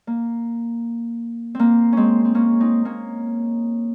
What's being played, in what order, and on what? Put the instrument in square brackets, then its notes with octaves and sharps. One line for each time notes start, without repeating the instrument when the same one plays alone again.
[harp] A#3
A#3 C4
G#3 C4 C#4
C4
A#3 C#4
C4 D#4
A#3 C#4